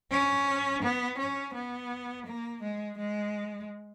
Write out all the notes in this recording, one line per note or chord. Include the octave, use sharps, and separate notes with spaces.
C#4
B3
C#4
B3
A#3
G#3
G#3